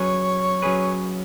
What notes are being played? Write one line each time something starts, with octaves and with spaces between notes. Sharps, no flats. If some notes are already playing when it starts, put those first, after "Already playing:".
Already playing: F#3 C#4 G#4 B4 C#5
F#3 C#4 G#4 B4